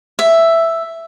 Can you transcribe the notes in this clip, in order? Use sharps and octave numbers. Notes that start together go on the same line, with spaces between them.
E5